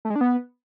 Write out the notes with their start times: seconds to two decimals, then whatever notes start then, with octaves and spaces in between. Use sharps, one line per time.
0.05 A3
0.10 G#3
0.16 D4
0.21 B3